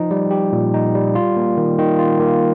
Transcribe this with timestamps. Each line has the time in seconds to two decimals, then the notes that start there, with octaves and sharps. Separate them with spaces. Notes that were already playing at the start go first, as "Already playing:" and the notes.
Already playing: F3 D#4
0.11 G3
0.31 G4
0.53 A#2
0.74 D#4
0.95 G3
1.15 F4
1.37 A#3
1.57 D#3
1.79 D#3
1.99 F4
2.20 A#3